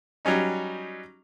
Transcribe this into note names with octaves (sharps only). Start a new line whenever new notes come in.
F#3 G3 C#4 D#4